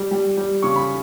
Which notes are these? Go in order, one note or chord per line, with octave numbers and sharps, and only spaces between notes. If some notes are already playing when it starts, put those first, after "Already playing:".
Already playing: G3
G3
G3
C#3 C#6
B5